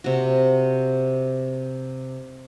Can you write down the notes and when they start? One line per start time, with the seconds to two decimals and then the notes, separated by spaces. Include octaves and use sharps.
0.04 C3 F#4